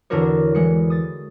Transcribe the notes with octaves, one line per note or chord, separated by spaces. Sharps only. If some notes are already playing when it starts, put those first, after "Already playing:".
E2 D3 D4 F#4 A#4 C#5
E3 G#3 C#7
D#6 A6